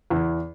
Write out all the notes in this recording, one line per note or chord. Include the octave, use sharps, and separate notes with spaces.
E2